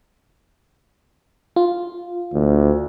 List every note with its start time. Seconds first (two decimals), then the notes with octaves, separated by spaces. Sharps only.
1.56 F4
2.34 D2